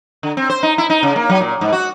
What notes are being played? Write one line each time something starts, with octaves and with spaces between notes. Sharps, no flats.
D3
C4
C5
D#4
E4
D#4
C#3
A#3
F#3
A#2
G#2
F#4